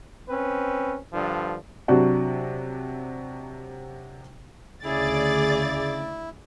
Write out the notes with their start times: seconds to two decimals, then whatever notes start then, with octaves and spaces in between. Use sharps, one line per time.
0.28 C4 C#4 B4
1.12 G2 D3 F3
1.88 C3 F#3 D4 F#4
4.84 D2 C#3 E4 G#4 D5 A6